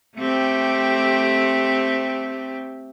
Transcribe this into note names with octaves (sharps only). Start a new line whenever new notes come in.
A3 C4 G4